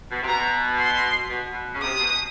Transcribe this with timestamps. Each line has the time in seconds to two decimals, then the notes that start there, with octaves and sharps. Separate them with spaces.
0.11 B2
0.23 C3
0.27 B2 A#5
0.79 C6
1.30 B2
1.52 B2
1.74 C#3
1.82 C3 D#6
1.99 B2